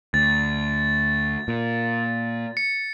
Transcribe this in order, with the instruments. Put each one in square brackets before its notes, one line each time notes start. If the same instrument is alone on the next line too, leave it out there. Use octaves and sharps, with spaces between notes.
[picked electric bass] D2 [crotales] A6
[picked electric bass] A#2
[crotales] C#7